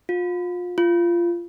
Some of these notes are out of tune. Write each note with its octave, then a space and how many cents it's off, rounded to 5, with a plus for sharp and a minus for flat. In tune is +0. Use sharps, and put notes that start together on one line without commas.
F4 +30
F4 -20